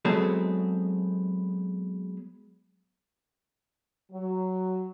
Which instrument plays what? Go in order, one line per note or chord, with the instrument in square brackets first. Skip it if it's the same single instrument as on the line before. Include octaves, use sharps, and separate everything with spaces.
[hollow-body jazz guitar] F#3 G#3 B3 C4 G#4 A4
[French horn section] F#3